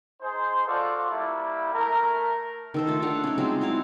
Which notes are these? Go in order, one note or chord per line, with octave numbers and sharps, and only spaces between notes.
D#4 G#4 C5
F4 F#4 A4 D5
G3 A#3 E4
A3 E4 A#4
D#3 A4 C5
A3 F4
A3 D4 F5 F#5
C#4 D#4
F#3 G#3 C4 F4
E4 F#4 F5